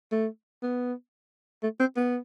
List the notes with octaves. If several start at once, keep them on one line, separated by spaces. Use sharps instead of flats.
A3
B3
A3
C4
B3